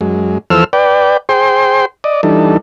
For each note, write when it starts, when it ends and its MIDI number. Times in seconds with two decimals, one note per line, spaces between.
0.01 0.38 42
0.01 0.38 56
0.50 0.64 40
0.50 0.64 53
0.50 0.64 69
0.50 0.64 72
0.50 0.64 88
0.50 0.64 89
0.73 1.17 71
0.73 1.17 74
0.73 1.17 79
1.29 1.85 68
1.29 1.85 72
1.29 1.85 79
1.29 1.85 84
2.04 2.21 74
2.04 2.21 75
2.23 2.57 52
2.23 2.57 55
2.23 2.57 62
2.23 2.57 63
2.23 2.57 69